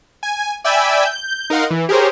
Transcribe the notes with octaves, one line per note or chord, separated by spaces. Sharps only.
G#5
D5 E5 G5 G#5 B5 E6
G6
D#4 A#4 F5 F#5 C6
E3
G4 G#4 A#4 C5 C#5